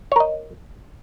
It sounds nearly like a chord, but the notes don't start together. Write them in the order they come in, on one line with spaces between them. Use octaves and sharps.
C#5 A#4 D#5